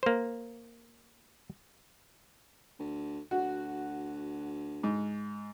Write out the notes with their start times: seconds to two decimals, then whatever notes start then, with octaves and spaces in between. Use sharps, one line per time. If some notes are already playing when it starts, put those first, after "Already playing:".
0.03 A#3 C5
2.79 D2
3.31 D2 F#4
4.83 G#2